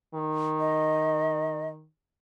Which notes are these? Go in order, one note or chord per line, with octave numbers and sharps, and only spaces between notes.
D#3
D#5